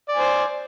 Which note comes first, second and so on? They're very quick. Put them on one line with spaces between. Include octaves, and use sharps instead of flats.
D5 G#5 C5